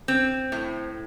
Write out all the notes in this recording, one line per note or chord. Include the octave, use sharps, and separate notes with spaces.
C4
A2